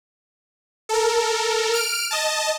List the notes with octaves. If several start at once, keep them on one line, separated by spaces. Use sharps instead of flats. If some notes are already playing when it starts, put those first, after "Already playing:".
A4 A#4
F6 D7
D#5 A5